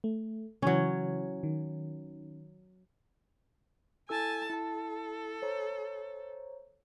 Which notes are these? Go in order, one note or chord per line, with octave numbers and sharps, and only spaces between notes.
A3
C#3 E3 F#3 C#4
D#3
E4 A4 G#5 A5 E6
E4 A4 A5
C5 C#5 A#5